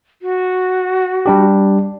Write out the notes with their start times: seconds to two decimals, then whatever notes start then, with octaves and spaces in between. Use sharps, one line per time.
0.22 F#4
1.26 G3 D4 G4